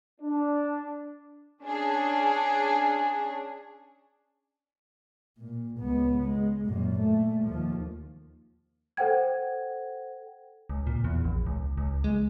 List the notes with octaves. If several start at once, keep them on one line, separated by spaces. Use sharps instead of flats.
D4
C#4 D4 G#4
A#2
C#2 B3
G#3
F#2 A#2
A#2 A3
D#2 F3
A4 C5 F#5 G5 G#6
C#2
A#2
E2
A#1
C#2
C#2
G#3